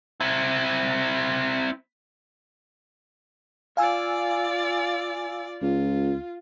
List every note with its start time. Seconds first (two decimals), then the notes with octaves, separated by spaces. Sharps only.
0.20 C4 E4
3.77 F4 D5 F5 G#5 E6
5.62 C#2 F4